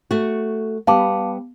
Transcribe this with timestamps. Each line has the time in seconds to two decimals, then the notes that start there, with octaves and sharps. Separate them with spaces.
0.11 A3 F#4
0.87 G3 B3 F5 A5 D6